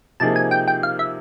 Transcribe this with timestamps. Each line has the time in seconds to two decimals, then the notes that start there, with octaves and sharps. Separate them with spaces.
0.20 C3 F3 A#3 D#4 G#4 A5
0.36 G#5
0.51 G5
0.68 G5
0.83 F5
0.99 E5